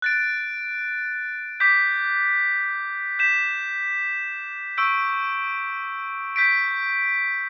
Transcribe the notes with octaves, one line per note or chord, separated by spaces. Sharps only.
F#6 A6 D7
D6 G6 B6
G6 B6 E7
C#6 E6 G6 D7
G6 B6 D7